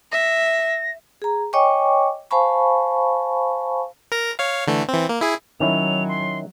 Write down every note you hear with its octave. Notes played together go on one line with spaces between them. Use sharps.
E5 A#6
G#4 A#5
C#5 D#5 G5 G#5 C#6 D6
C5 F5 G#5 A5 B5 C#6
A#4 A#5
C#5 F5
D3 E3 A3
E3 C4
A#3
E4 G#4
D#3 F#3 C#4 E4 F7
C6